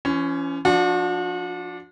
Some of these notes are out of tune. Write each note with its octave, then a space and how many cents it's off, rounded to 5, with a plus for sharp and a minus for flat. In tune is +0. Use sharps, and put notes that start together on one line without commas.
E3 +45 C#4 +0
F3 +0 D4 +0 F#4 -40